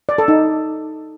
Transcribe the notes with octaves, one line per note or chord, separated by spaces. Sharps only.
D5
A4
D#4